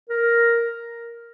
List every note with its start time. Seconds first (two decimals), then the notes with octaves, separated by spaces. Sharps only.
0.09 A#4